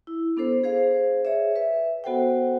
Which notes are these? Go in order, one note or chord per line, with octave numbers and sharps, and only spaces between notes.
E4
B3 D4 A4 C5
G#4 C5 F5
G#4 C#5 D5 E5
B4 E5
B3 F#4 A4 C5 F#5 G5